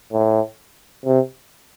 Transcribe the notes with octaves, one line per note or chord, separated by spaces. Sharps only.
A2
C3